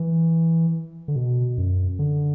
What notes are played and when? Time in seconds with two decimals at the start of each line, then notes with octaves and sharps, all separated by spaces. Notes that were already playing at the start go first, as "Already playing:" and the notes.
Already playing: E3
1.08 D3
1.16 B2
1.58 F#2
1.99 D3